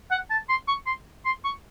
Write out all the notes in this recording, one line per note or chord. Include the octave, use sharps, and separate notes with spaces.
F#5
A5
C6
C#6
C6
C6
C#6